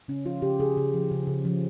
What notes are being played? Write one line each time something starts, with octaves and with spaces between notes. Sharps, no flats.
C#3 C#4
F3 F4
C#3 G4
C#3 G#4
C#3
F3
C#3
C#3
F3